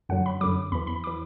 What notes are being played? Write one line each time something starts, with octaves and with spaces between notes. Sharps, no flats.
F#2 D3 F#3 F#5
B5
F#2 D3 F#3 D6
E2 E3 B5
B5
E3 D6